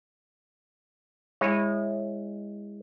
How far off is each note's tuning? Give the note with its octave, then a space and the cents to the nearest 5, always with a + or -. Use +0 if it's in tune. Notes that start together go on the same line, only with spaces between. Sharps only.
G#3 -25 E4 +0 C#5 -25